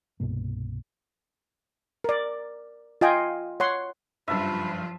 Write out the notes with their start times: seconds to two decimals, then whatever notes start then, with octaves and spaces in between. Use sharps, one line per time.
0.20 C2 G2 B2 A#3
2.04 A#4 D5
3.01 F4 D#5 G5 G#5
3.60 C#5 F#5 C6
4.28 F#1 G2 F3 F4 B4 E5 A5